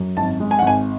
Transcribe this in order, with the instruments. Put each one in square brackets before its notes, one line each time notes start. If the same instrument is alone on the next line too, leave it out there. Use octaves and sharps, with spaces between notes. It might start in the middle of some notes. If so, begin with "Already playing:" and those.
Already playing: [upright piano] F#2
G#1 A5
G#3
G#5
F#5
G#1
G#5